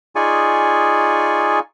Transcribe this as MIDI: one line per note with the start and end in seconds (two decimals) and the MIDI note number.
0.16 1.59 63
0.16 1.59 65
0.16 1.59 68
0.16 1.59 74
0.16 1.59 80
0.16 1.59 85